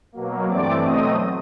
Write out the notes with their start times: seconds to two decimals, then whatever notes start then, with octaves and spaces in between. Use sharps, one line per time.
0.12 B2 F#3 A#3
0.47 G2 E3 A3 C4 D5 D6
0.82 B2 F#3 A3 C4 D#5 D#6